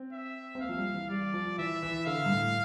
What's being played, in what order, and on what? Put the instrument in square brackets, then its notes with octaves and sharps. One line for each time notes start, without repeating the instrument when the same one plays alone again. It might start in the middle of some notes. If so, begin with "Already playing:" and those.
Already playing: [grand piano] C4
[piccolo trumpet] E5
[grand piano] C4
[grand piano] A#3 [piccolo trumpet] F5
[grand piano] F3
G3
E3
[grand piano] G3 [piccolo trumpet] D5
[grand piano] F3
[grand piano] E3 [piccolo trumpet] E5
[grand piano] E3
[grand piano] D3 [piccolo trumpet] F5
[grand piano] G2
A2